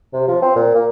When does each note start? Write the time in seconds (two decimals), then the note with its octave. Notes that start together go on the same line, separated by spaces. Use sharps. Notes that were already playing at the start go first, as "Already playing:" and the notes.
0.14 C3
0.28 F3
0.42 C4
0.56 A#2
0.74 A#3